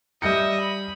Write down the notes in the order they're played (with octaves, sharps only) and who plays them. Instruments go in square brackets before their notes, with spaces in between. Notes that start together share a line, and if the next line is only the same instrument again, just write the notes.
[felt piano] G3 G6 C#7 [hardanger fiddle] D#5 E5
[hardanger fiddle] B5